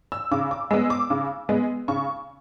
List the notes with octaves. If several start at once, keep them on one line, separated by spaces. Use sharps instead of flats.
E6
C#3 D6
D6
G#3 B3 E6
D6
C#3
G#3 B3
C#3 C#6